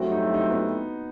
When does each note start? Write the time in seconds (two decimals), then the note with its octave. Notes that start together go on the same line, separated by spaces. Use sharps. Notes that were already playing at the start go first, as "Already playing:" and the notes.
Already playing: G2 F#3 A3 C4 E4 F#4
0.12 D#4
0.34 D#4
0.50 B3